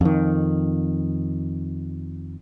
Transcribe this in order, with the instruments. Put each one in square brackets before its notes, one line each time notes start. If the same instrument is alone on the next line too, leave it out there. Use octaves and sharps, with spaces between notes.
[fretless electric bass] F2 D#3